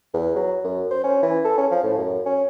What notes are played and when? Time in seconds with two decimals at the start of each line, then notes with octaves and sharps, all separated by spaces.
0.14 E2
0.36 F#3
0.64 F#2
0.91 C5
1.04 C#4
1.23 E3
1.44 A4
1.58 C#4
1.71 F3
1.83 A2
1.98 F#2
2.26 C#4